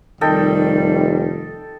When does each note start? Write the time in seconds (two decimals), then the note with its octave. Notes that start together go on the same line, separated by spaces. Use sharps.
0.21 F1 D#3 G3 A4 D#5 G5